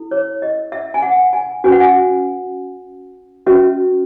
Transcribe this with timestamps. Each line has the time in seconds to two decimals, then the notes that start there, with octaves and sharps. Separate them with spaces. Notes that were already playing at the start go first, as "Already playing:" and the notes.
Already playing: E4 A4
0.11 C#5
0.42 D#5
0.72 E5
0.94 G#5
1.02 F#5
1.33 G#5
1.64 C#4 F#4 B4 G#5
1.72 F#5
1.80 G#5
3.46 C#4 F#4 B4 E5